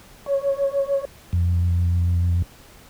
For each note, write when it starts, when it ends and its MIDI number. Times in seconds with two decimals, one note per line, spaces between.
0.26 1.05 73
1.33 2.42 41